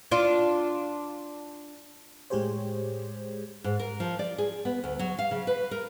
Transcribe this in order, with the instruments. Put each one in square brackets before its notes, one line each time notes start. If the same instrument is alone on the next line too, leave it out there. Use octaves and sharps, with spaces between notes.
[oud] D4 F4
[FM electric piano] A2 G#3 G4 G#4 C5 C#5
[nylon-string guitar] G#2
A#4
F3
D5
G#4
B3
D2
F#3
F5
C#3
B4
A#4